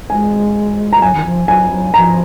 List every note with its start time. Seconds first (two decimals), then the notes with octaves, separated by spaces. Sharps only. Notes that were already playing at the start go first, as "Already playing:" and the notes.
0.10 G#3 G#5
0.93 G#3 A#5
1.02 F#3 G#5
1.15 D#3
1.25 F3
1.48 F#3 G#5
1.72 F#3
1.94 F3 A#5